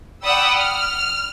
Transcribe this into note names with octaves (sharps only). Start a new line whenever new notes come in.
D5 F#5 G5 B5 D#6 E6
F6